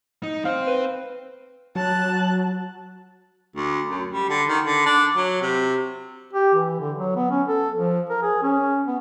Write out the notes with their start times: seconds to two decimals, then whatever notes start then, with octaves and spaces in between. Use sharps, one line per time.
0.23 D#4
0.45 C4 C5 F5
0.67 B4
1.76 F#3 A5 F#6
3.56 D2
3.89 F#2
4.11 G3
4.29 D3
4.48 D#3
4.65 D3
4.86 D4
5.16 F#3
5.41 C3
6.33 G4
6.55 E3
6.80 D3
6.97 F#3
7.16 B3
7.31 C#4
7.48 A4
7.75 F3
8.09 A#4
8.22 G#4
8.43 C#4
8.87 B3